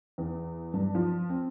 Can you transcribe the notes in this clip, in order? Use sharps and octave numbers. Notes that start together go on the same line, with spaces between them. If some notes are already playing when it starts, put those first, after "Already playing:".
E2
G2
F3
C4